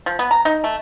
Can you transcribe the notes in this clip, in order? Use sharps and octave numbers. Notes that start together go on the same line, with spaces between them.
F3
B3
A#5
D#4
A3